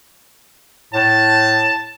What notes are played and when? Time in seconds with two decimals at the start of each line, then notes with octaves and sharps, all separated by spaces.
0.94 A2 A5